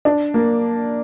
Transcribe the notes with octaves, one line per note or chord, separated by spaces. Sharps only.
D4
A#3